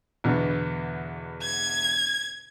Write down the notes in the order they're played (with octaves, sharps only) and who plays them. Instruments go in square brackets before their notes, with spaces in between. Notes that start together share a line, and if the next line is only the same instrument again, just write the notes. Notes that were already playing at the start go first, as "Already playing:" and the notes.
[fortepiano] E2 B2 D3
[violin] G#6